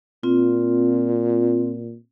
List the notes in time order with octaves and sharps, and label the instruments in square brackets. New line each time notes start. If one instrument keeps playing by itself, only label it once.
[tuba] A#2 [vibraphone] C4 F4